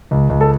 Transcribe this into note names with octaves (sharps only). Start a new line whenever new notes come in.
C#2
C#2
A4